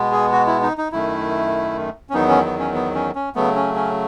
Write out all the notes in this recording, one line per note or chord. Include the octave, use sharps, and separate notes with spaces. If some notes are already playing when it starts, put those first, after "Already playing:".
Already playing: B2 G#3 B3
G#4
F#4
E4
D#4
D#4
F#2 D#3 A3 E4
C#4
E2 D#3 F#3 B3 D#4
C#4
B3
C#4
B3
C#4
C#4
C#3 F#3 A3 B3
C#4
C#4